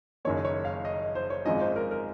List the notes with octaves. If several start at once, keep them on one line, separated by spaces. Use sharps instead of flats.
F#1 F#2 D#3 A#3 C#5
C#5
F5
D#5
C5
C#5
G#1 F#2 F3 G#3 D#5
C5
A#4
A#4